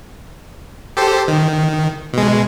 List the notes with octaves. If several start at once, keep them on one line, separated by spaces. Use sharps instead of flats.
G4 A4 C5
D#3
B2 G#3